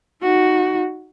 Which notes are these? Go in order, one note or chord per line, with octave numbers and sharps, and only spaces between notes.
D#4 F#4